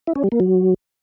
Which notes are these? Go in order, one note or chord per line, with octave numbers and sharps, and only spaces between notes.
E4
C#4
G3
A#3
F#3